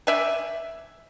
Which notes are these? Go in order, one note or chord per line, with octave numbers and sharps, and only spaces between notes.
D5 E5 G#5